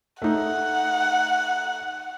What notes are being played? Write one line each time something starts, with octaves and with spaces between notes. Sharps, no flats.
A3 D#4 F#5